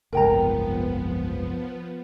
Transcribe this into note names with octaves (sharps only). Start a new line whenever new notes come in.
F#1 C2 G#2 F3 B3 A#4 G5 A#5